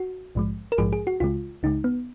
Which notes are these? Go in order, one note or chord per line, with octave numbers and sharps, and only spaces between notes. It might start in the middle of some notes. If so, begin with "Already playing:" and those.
Already playing: F#4
A#1 G#2 F3 G#3
A#4
A#1 G#2 F3 G#3 G#4
G#4
F#4
C#2 C#3 G#3 F4
C#2 C#3 G#3 D#4
B3